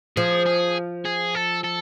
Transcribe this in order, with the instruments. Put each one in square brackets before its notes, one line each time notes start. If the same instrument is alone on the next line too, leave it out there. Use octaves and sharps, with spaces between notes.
[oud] F3 [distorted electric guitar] G#4
[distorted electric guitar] G#4
G#4
A4
A4